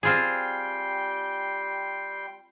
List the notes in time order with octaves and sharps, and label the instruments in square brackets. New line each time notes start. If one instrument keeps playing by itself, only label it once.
[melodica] G3 G5 C6 [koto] C4 F4 G#4